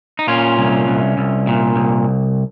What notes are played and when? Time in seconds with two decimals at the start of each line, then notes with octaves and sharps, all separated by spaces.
0.19 D#4
0.28 A#2 C#4 F4
0.58 C2
0.88 C2
1.18 C2
1.47 A#2
1.76 C2